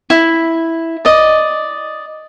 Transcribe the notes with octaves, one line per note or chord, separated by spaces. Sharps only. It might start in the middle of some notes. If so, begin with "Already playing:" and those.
E4
D5 D#5